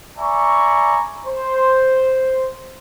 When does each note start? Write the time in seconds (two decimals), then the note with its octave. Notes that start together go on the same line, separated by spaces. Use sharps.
0.18 D5 E5 G#5 A#5 B5 C#6
1.26 C5